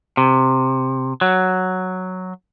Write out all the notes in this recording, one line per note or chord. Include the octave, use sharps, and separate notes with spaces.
C3
F#3